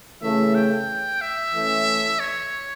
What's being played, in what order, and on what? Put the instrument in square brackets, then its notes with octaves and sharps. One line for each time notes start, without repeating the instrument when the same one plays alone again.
[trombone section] C#3 E3 A3 [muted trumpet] E5
[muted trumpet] G5
E5
[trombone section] E3 A3 C#4
[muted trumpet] C#5